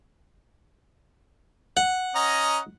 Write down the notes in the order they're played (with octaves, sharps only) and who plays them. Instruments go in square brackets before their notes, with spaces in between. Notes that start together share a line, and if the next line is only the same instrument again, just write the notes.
[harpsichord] F#5
[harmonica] C#4 D#5 A#5